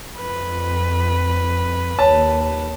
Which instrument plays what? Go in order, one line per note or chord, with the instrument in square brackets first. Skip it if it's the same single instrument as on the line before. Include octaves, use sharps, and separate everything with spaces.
[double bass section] F2 [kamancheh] B4
[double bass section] D#2 [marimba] C#5 [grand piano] A5